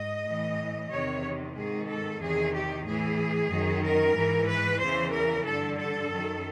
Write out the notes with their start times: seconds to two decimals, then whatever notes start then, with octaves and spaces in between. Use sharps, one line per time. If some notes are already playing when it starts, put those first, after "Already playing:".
Already playing: G#2 D#5
0.25 A2 E3
0.90 E2 C3 D#3 C#5
1.55 G#2 D#3 G#4
1.87 A4
2.20 E2 C3 D#3 G#4
2.53 G4
2.84 A2 E3 G#4
3.50 F#2 D#3
3.82 A#4
4.15 G#2 E3
4.47 B4
4.79 E2 C#3 E3 C5
5.12 A#4
5.44 G2 D3 A4
5.76 A4
6.09 F#2
6.14 D#3